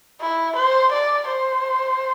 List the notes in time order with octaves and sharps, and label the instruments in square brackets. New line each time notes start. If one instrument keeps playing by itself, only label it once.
[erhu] E4
C5
D5
C5